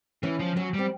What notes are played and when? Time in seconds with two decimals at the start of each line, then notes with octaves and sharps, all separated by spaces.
0.23 E3 C#4
0.40 F3
0.56 F#3 C#4
0.73 G3
0.79 C4